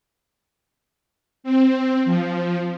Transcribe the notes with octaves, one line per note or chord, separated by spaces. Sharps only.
C4
F3